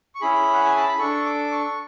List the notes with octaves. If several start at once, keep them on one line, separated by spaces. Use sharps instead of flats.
C#6
C#4 E4 G#4 B5
F#5
G#5
A5
B5
D4 A4 C#6
D6
C#6